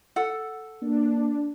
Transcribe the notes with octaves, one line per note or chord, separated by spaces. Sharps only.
A4 F#5
A#3 D4